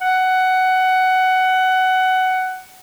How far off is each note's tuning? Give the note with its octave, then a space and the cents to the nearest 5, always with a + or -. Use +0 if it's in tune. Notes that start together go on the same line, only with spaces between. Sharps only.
F#5 +15